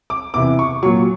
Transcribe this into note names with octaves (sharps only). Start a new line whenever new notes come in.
D6
E2 C3 E3 D6
C#6
A#2 F#3 C#6